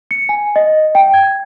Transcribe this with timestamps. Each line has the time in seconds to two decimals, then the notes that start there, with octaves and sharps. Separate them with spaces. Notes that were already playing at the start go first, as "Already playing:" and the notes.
0.11 C#7
0.29 G#5
0.56 D#5
0.95 G5
1.14 G#6